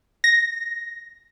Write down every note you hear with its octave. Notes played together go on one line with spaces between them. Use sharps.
A#6